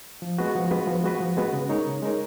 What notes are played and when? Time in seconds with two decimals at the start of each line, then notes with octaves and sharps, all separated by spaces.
0.22 F3
0.38 G#3 B3 F#4 B4
0.55 F3
0.71 G#3 B3 F#4 B4
0.87 F3
1.04 G#3 B3 F#4 B4
1.20 F3
1.37 G#3 B3 F#4 B4
1.53 C#3
1.69 G#3 D#4 A#4 C#5
1.86 C#3
2.02 G#3 D#4 A#4 C#5